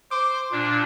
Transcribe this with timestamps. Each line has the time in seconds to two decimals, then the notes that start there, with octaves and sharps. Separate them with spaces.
0.11 C5 D6
0.52 A#2 D4 D5